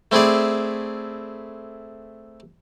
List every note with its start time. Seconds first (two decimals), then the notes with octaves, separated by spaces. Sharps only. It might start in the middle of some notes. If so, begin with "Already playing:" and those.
0.12 A3 C4 E4 G#4 D5